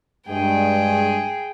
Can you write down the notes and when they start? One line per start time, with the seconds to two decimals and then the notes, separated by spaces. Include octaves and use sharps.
0.28 G2 G#3 G#4 G5